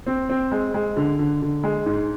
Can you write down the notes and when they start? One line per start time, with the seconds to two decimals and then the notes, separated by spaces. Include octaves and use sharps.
0.06 C4
0.29 C4
0.52 G#3
0.74 G#3
0.96 D3
1.19 D3
1.42 D3
1.63 G#3
1.86 G#2